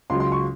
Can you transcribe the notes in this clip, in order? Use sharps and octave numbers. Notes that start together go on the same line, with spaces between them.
C#2 C#3 F#3 C6
C6
C#6